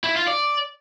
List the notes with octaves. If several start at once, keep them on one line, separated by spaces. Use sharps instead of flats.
E4
F4
D5